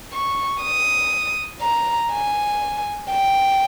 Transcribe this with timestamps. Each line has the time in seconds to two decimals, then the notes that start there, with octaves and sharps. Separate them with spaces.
0.13 C#6
0.62 D#6
1.62 A#5
2.12 G#5
3.12 G5